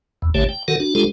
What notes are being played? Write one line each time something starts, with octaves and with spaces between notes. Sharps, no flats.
E2
A1 D3 A3 G4 C#5
G5
D#3 F#4 A4 A#4 F#5
D4 F#4
G#3 D4 F4 G4 A4